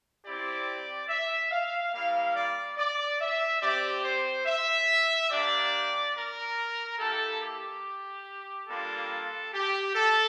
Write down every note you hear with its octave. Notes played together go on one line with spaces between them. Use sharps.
C4 E4 G4 D5
E5
F5
G3 A#3 E4 F5
D5
D5
E5
C4 G4 D5
C5
E5
A#3 D4 G4 D5
A#4
A#3 E4 G4 A4
G4
G3 A#3 D4 F4 A4
G4
A4